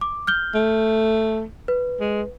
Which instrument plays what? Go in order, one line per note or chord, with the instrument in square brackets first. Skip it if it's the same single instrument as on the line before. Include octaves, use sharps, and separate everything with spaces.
[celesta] D6
F6 G6 G7
[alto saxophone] A3
[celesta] B4
[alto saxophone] G#3